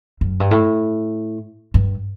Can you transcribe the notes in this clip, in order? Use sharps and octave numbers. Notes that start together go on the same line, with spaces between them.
F#2
G2
A2
G2